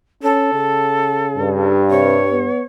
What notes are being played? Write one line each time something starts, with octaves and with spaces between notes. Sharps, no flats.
C#4 A4
C#3
G2
C3 C#5
B3